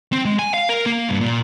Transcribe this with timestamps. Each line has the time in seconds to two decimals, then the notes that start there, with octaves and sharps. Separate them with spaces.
0.12 C4
0.25 G#3
0.39 G#5
0.54 F5
0.69 A#4
0.86 A#3
1.09 G2
1.21 A#2